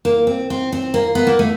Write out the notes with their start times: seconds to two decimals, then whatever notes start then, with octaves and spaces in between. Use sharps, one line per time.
0.05 A#3
0.27 C4
0.50 C4
0.72 C4
0.94 A#3
1.15 B3
1.27 A#3
1.39 A3